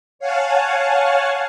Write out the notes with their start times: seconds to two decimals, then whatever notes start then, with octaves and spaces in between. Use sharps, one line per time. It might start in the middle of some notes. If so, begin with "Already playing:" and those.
0.19 C#5 F5 F#5 G#5 A5